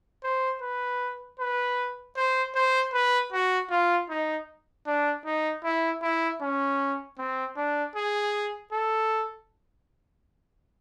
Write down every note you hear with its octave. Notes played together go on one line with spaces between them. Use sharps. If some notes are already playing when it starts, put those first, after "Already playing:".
C5
B4
B4
C5
C5
B4
F#4
F4
D#4
D4
D#4
E4
E4
C#4
C4
D4
G#4
A4